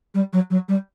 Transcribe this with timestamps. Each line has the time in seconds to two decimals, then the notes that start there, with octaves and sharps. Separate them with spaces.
0.15 G3
0.33 F#3
0.50 F#3
0.69 G3